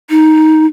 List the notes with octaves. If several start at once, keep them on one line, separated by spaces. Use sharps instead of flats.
D#4